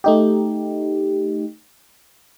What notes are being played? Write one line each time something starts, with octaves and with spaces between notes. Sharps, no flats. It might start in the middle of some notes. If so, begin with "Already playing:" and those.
A3 D#4 G4